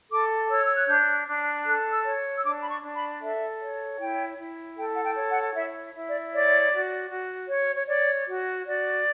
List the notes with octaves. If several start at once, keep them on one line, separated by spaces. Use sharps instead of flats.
A4 D6
C#5 E6
E6
F#6
D4 G6
D4
A4 F#6
E6
C#5
E6
D4 D6
B5
C#6
D4
B5
A4 E5
C#5
E4 G5
E4
A4 G5
F#5
G5
C#5
F#5
E4 E5
E4
D5
C#5 D5
F#4
F#4
C#5
C#5
C#5 D5
F#4
F#4 D5